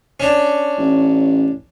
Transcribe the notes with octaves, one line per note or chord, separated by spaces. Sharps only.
C#4 D4
A1